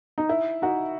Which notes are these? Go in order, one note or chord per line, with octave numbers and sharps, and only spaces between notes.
D#4
E4
D#4 F#4